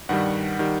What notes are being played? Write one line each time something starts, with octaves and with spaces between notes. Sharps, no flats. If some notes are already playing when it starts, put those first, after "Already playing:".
G2 D#3 G3 F#5
D#3 G3